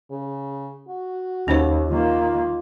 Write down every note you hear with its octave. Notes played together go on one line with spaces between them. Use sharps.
C#3
F#4
D#2 C#4 D#4 C5
D#3 A#3 F4